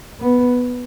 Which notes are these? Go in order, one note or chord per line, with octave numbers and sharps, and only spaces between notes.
B3